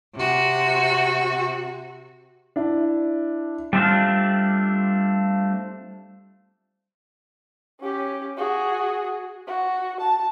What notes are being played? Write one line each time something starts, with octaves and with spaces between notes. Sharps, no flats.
C3 F#4
D4 E4
G3 A3 C4 D4 F4
C#4 G4
F#4 G#4
F#4
A5